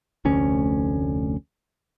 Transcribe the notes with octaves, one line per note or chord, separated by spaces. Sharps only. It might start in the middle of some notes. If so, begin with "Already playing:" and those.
F1 D2 C#4